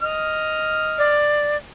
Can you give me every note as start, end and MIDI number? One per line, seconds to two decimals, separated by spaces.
0.02 1.11 75
0.02 1.11 89
0.98 1.57 74